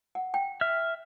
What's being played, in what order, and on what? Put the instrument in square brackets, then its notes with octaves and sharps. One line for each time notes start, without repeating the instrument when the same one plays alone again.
[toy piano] F#5
G5
[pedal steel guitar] E5 F6